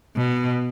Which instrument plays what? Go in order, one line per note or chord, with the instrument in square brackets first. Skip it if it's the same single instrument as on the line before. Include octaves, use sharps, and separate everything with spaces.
[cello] B2